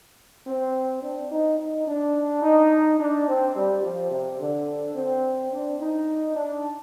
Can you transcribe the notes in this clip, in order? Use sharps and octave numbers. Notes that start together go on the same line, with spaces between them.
C4
D4
D#4
D#4
D4
D#4
D4
C4
G3
F3
C3
D3
C4
D4
D#4
D4